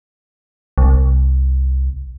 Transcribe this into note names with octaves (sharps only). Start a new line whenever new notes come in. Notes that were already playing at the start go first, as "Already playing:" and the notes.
C2